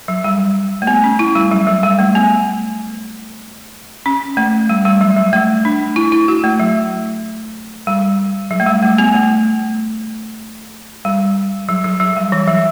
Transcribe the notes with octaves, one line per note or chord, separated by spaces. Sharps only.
F#3
G3
A3
B3
C#4
E4
G3
F#3
F#3
G3
A3
B3
C#4
A3
G3
G3
F#3
F#3
A3
D4
E4
E4
F#4
A3
F#3
G3
F#3
A3
G3
A3
B3
A3
G3
F#3
F#3
F#3
G3
E3
F#3